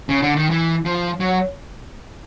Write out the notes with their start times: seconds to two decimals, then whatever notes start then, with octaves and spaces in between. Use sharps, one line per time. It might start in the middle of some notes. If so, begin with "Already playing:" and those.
0.09 C#3
0.22 D3
0.36 D#3
0.50 E3
0.85 F3
1.20 F#3